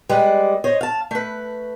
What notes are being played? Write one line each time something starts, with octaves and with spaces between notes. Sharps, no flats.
G3 G#3 B4 D5
C5 C#5 D#5
F5 A5
A3 B4